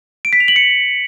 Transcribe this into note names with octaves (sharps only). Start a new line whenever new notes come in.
D7
B6
F7
F#7
C#7